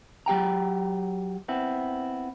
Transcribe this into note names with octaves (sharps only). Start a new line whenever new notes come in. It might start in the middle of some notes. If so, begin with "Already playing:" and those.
F#3 G4 G5 A#5
B3 C4 E4